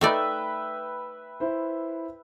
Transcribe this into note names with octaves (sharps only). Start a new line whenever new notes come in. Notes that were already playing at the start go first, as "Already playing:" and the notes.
A3 D#4 B4 D5 E5 G5
E4 C5